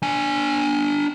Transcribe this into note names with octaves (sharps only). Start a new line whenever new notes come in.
D4 G#5